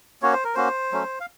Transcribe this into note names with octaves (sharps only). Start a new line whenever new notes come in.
A#3 C#4 F#4 C#5
C5
A#4
A#3 C#4 F#4 C5
F#3 A3 C#4
F5